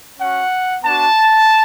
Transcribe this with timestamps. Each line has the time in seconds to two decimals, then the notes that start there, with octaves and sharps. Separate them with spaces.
0.19 C#4 F#4 F#5
0.83 B3 D4 F#4 A5